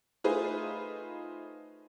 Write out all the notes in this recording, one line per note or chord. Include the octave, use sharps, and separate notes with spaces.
A3 D#4 F4 G#4 B4 C5